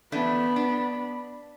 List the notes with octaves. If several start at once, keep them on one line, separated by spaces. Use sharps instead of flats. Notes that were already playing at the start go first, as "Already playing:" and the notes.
E3 A3 B3 D4 B5
D4